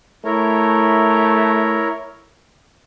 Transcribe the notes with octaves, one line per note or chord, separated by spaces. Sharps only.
A3 E4 A#4 C#5